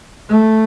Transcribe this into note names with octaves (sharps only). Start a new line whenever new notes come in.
A3